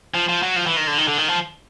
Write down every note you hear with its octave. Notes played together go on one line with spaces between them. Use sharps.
F3
F3
F#3
F3
E3
D#3
D3
D#3
D3
D#3
F3